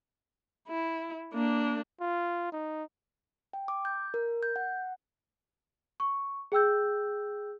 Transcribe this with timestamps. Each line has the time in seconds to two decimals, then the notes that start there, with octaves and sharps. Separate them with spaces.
0.68 E4
1.33 A#3 D4
2.01 F4
2.52 D#4
3.53 G5
3.68 D6
3.85 G6
4.14 A#4
4.43 G6
4.56 F#5
6.00 C#6
6.52 G#4 G5 E6 G6